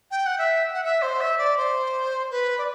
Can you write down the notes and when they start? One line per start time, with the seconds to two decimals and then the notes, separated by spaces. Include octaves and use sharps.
0.11 G5
0.26 F#5
0.38 E5
0.74 F#5
0.84 E5
1.02 C5
1.21 E5
1.38 D5
1.57 C5
2.31 B4
2.58 D5